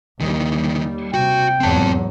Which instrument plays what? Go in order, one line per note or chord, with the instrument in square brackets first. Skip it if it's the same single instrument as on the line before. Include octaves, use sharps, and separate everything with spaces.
[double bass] D#2 [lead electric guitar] D#3 E3 [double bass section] G3
[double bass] C3 [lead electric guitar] F#4 [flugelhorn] G5
[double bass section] F1 G#2 [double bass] E2 F#3 [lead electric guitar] C4 A5